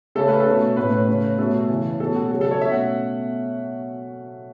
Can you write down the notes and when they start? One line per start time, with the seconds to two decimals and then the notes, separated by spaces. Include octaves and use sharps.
0.15 C#3 A3 C#4 A4
0.28 B4
0.40 A4
0.46 B2 A3 C#4
0.77 A2 A3 C#4 B4
1.08 C#3 A3 C#4
1.38 B2 A3 C#4 A4
1.69 C#3 E3 C#4
2.00 B2 A3 C#4 A4
2.15 F#4
2.31 C#3 F#3 C#4 A4
2.41 A4
2.51 C#5
2.61 B2 A3 C#4 E5
2.72 F#5